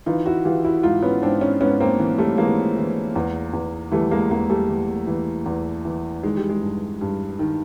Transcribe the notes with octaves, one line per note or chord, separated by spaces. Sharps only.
E3 D#4 F4
E4 F#4
E3 F4 G4
E4 F#4
G#2 D#4 F4
B3 C#4
G#2 C4 D4
C#4 D#4
G#2 B3 C#4
A#3 C4
E3
G3 A3
E3 G#3 A#3
E3
E2
E2
E3 G3 A3
G#3 A#3
E2 G#3 A#3
G3 A3
E3
E3
E2
E3
D#3 G#3
G3
G#3
G2
G2
D#3